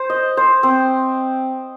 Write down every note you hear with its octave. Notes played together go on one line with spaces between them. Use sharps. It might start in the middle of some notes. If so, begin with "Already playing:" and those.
Already playing: C5
D#5
C5
C4